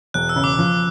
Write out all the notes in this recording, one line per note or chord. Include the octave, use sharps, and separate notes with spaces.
E1 F#6
E6
C#3
D6
F3